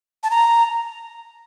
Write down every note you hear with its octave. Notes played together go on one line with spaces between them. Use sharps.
A5
A#5